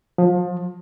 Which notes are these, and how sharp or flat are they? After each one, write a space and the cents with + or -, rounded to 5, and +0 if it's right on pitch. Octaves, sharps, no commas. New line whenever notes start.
F3 +30